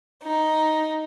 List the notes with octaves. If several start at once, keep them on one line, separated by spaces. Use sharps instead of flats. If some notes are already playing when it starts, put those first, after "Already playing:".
D#4